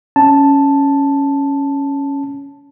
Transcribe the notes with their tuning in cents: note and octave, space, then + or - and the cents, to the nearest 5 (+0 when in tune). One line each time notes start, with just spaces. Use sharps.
C#4 +0 A5 +0